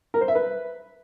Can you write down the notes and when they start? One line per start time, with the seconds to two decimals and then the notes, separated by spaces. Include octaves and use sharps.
0.14 A#4
0.21 C5
0.28 E5
0.35 B4